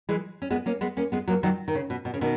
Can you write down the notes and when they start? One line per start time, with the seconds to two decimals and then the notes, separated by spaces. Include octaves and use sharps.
0.09 E3 G#3
0.42 C#4
0.50 G#3 B3
0.66 A#3 C#4
0.81 G#3 B3
0.97 A#3 C#4
1.12 G#3 B3
1.27 F#3 A#3
1.43 D#3 F#3
1.68 D#3
1.75 C#3
1.90 B2
2.05 B2
2.14 C#3
2.21 B2 D#3